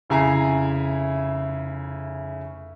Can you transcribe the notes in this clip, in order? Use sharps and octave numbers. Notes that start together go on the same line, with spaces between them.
F1 C#3 E4 G#5 A#5 C7